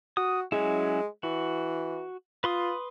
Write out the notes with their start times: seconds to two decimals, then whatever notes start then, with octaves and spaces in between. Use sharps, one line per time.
0.17 F#4 D#6
0.52 F#3 G#3 C#4 E4
1.23 E3 F#4
2.44 F4 B4 C6 D#6